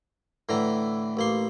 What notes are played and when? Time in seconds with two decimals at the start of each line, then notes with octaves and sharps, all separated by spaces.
0.49 A2 D3 E3 A#5
1.17 A1 A#3 C6